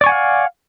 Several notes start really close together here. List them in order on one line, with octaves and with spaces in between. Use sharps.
D5 C#6 G#5 F#5 F5